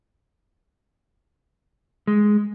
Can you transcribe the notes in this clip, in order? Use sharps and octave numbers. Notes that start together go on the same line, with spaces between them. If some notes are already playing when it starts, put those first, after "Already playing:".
G#3